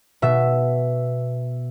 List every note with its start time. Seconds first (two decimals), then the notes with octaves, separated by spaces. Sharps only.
0.22 B2 E5